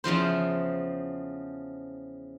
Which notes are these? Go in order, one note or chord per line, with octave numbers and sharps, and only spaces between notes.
E2 C#3 F3 C5